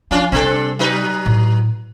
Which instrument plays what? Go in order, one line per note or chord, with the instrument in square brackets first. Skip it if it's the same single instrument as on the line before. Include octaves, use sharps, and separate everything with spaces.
[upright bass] F3 [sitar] C#4 D4 F4
[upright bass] C3 G3 [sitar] C4 D4 A4
[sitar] F#3 D#4 B4
[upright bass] A2